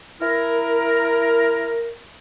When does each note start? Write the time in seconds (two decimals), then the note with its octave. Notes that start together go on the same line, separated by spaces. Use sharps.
0.22 E4 A#4